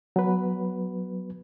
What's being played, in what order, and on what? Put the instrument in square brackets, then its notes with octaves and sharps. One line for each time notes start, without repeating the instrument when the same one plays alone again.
[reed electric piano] F#3 B3 B4